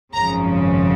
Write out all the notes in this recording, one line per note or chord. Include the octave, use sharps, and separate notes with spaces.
G#1 F#2 C#3 F3 A#5